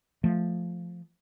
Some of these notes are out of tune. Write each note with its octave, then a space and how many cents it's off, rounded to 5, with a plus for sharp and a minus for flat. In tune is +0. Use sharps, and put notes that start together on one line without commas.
F3 +0 A3 +0